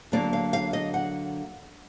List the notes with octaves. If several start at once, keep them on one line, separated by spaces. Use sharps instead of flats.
D3 F#3 A#3 D5
F5
F5
D#5
F#5